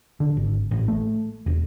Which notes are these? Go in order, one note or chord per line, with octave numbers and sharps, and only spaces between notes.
D3
G#1
A1
A3
E1